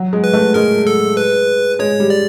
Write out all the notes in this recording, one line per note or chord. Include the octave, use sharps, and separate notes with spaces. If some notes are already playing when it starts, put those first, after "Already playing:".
Already playing: F#3
G#3
B4
A3
G#3 A#4
A4
B4
G#3 C#5
G3
D5